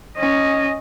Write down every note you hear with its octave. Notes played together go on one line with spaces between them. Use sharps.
C#4 D#5